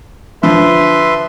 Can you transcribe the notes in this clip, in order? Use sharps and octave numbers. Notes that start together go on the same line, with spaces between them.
D3 F3 B4 E5 C6